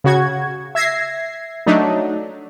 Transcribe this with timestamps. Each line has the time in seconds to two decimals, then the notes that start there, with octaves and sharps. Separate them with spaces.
0.04 C#3 F#4 G#6
0.75 E5 G#6 A#6 C7
1.66 F#3 A3 D4 D#4